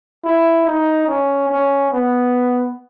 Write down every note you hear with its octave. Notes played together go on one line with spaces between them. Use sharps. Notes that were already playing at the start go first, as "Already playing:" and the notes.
E4
D#4
C#4
C#4
B3